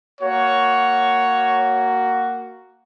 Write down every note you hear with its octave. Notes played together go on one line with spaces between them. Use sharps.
A#3 F#4 C#5